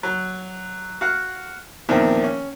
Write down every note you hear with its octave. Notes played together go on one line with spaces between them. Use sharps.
F#3
F#4 F5 F#5
E2 A#2 D#3 F3 C4 D4
C#4